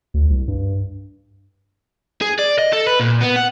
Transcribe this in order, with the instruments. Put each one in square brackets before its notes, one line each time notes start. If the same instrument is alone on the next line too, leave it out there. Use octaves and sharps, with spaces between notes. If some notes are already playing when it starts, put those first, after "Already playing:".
[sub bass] D2
C2
G2
[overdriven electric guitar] G#4
D5
D#5
A4
B4
A#2
B3
F#5